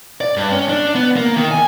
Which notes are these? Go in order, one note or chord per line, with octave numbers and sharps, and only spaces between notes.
D5
G2
C#4
D4
B3
A#3
D#3
G#5